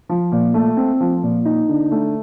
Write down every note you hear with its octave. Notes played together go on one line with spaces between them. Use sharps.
F3
A#2
A3
C4
F3
A#2
D#4
D3
A3